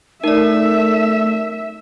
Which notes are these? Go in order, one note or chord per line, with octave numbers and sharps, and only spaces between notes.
A3 D#4 A#4 D5 E5